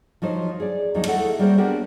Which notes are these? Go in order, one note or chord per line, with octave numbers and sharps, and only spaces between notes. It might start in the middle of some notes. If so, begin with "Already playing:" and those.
F3 F#3 D#4 C5
G#4 D5
D#2 F3 F#3 D#4
A3 E4 G#4 A4 E5 F#5
G3 A#3 F#4 G#4 A#4 C5
B3 D4 F#4 G4 A#4 C5